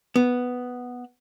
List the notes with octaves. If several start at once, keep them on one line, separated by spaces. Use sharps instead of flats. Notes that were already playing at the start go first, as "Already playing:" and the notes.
B3